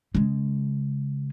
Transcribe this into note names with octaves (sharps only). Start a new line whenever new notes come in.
C#3 G#3